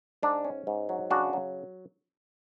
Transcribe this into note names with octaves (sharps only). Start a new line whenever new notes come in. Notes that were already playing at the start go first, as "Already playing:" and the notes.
G#2 D4
C#4
G#2
F#3
C#3 D4 F#4
F#3